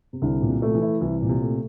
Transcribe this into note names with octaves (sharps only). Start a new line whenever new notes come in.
C3
C2 D3
A#2
C3
A3
F3
E3
E4
C2 E3
A#2
C3
A3